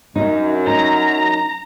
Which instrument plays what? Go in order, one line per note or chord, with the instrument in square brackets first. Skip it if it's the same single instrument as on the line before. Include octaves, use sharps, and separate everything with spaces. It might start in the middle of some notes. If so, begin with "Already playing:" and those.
[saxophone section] F#2 [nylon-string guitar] D#4
[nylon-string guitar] D#4 [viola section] A#5